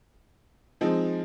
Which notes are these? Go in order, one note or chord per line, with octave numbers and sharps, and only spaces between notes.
F3 G#3 C4 D#4